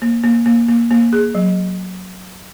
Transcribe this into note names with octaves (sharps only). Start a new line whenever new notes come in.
A#3
A#3
A#3
A#3
A#3
G#4
F#3